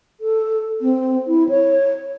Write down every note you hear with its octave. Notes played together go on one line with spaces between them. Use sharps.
A4
C4
E4
C#5